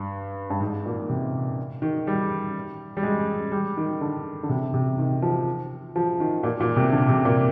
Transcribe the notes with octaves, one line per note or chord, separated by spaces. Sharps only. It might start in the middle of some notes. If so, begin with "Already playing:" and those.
Already playing: G2
G2
G#2
A#2
C3
D#3
G3
G3
G#3
G3
D#3
D3
D3
C3
C3
D#3
F3
F3
D#3
A#2
A#2
C3
D3
C3
A#2